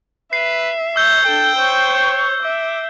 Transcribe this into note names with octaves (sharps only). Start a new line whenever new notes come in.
B4 E5 C7
C#5 E6 G6 G7
D4 A4 G5
C5 C#5
E5 D6